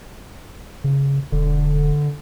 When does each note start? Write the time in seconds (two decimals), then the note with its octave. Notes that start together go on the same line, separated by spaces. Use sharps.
0.84 C#3
1.32 E1 D3